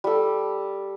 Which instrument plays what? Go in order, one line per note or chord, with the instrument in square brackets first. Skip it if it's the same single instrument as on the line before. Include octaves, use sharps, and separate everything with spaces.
[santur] G3 A4